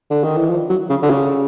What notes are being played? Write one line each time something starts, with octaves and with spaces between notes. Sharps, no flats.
D3
D#3
E3
F3
F#3
C#3
D3
C#3